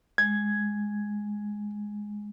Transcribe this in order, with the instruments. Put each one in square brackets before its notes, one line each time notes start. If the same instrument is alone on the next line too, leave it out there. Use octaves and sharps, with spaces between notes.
[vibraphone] G#3 [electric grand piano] G#6